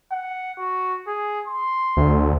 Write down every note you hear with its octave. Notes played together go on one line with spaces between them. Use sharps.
F#5
F#4
G#4
C6
D2